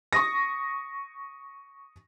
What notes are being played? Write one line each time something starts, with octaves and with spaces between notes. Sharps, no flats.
C#6 D#6 A#6